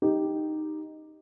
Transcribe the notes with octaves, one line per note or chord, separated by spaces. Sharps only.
D#4 G4